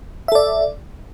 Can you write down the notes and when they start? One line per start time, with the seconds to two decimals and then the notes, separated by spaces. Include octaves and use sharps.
0.28 E5
0.32 A4
0.35 D5